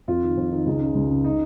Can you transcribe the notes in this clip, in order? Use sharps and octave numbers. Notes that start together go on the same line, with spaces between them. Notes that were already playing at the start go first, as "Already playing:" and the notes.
F2 F4
D#3
F2
D#3
C#2 D#4
C#3
C#2
C#3
D#4